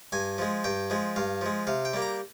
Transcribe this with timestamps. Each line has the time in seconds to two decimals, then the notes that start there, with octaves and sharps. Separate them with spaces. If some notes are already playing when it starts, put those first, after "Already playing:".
0.12 G2 G#5
0.38 F3 G#3
0.64 G2 G5
0.90 F3 G#3
1.16 G2 F5
1.41 F3 G#3
1.67 C3 F5
1.85 G5
1.93 G3 A#3
2.02 A#5